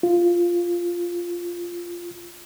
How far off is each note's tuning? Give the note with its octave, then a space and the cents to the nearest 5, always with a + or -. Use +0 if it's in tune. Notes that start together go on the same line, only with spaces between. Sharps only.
F4 -5